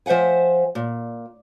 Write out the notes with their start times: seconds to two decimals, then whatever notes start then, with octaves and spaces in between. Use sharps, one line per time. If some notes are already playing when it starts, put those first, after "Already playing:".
0.06 F3 C5 E5 F#5 G#5
0.75 A#2